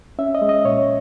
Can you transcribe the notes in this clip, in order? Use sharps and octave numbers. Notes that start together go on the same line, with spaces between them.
C#4 E5
D#5
G#3
D#5
A#2 C#5